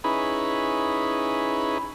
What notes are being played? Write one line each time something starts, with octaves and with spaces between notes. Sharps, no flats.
C#4 D#4 E4 G#4 B4 B5